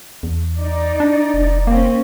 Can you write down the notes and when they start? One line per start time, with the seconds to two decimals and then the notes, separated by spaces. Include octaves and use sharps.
0.23 E2
0.58 D#4 D5
1.00 D4
1.34 F1
1.67 A#3 C4 C#4